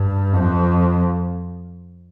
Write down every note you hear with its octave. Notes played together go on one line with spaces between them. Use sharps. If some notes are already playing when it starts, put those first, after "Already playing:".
Already playing: G2
F2